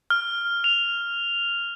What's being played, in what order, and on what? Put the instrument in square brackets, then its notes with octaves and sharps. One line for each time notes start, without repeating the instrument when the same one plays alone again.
[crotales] F6
F7